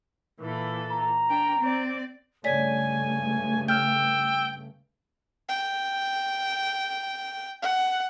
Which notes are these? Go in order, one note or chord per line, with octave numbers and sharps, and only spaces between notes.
A#2 E3 A4
A#5
D4 A#4 G5
C4 D5
G2 C#3 A3 C#5 D5 G#5 B6
G5 E6 F6 G6
G5
F#5